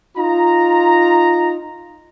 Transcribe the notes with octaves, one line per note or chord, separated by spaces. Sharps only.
D#4 F4 A#5